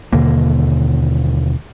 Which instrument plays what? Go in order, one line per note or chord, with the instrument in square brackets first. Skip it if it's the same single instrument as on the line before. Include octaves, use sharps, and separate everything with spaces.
[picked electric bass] D#2 B2 D3 A#3